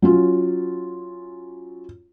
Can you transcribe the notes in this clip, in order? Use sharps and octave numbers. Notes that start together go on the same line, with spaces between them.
F#3 C#4 F4